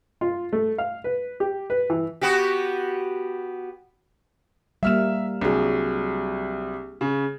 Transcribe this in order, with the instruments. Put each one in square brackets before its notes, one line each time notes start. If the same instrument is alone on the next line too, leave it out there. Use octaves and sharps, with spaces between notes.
[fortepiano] F4
A3
F5
B4
G4
B4
E3
[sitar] B3 F#4 G4
[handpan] G3 A#3 [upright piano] E5 F6 E7
[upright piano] C2 F#3 [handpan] D4 G#4
[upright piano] C#3